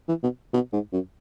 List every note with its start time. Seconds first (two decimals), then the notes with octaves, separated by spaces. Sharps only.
0.08 E3
0.23 B2
0.54 B2
0.73 G#2
0.93 F#2